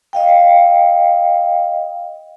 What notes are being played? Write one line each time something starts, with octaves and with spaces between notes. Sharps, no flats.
D#5 F5 G5